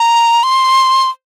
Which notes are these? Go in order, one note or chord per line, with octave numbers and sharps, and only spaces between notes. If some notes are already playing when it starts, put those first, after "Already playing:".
Already playing: A#5
C6